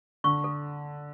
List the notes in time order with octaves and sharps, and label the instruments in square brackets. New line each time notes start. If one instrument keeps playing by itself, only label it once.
[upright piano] D3 [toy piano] C#6
[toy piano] A4